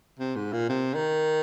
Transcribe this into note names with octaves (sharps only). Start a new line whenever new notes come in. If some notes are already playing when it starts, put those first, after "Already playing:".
C3
G#2
A#2
C3
D#3